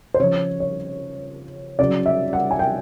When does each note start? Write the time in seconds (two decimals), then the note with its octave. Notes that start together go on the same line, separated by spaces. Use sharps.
0.14 C5
0.20 C#3 F3 C#5
0.60 C#5
1.79 C#3 F#3 D5
2.06 E5
2.33 F#5
2.51 G#5
2.59 G5